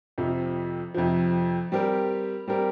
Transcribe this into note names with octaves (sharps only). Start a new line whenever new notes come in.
F2 C3 F3
F2 C3 F3
G3 C4 G4 A#4
G3 C4 G4 A#4